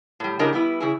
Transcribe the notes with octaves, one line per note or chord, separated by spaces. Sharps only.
A2 G3
A2 C#3 D4 G4 A#4 D#5
G3 B3 E4
C#3 E4 G#4